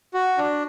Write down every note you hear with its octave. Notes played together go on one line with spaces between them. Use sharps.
F#4
D4